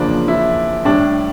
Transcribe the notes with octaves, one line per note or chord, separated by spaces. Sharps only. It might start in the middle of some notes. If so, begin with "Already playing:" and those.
Already playing: E2 C#3 F3 A#3 D4
E4
A2 G3 D4